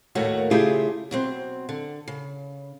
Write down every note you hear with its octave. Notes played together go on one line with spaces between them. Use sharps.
D#2 A2 A3 A#3 F#4 C#5
C#3 A3 E4 F4 G4 G#4
B2 F#3 C4
D3
C#3